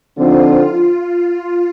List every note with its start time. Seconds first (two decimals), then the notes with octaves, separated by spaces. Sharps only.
0.15 D3 F3 C4 D#4 F4
0.83 F4